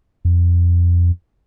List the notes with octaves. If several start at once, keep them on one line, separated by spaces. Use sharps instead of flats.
F2